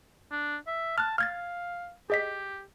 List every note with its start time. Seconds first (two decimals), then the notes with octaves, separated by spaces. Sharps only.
0.31 D4
0.67 E5
0.98 A5 F6 F#6
1.18 F5 F6 G#6 A6
2.10 G4 G#4 D#5 B6